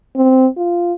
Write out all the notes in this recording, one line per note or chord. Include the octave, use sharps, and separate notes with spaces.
C4
F4